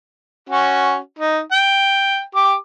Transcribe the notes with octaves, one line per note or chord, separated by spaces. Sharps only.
C#4 F#4
D#4
G5
G4 D6